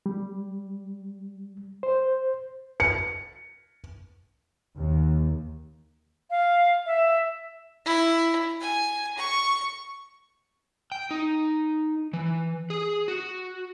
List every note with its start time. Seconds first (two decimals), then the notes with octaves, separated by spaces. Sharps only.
0.06 G3
1.83 C5
2.80 C#7
4.76 D#2
6.30 F5
6.86 E5
7.85 E4
8.61 G#5
9.17 C#6
10.92 G5
11.11 D#4
12.13 E3
12.70 G#4
13.08 F#4